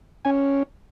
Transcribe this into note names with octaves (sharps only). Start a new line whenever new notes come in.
C#4 G#5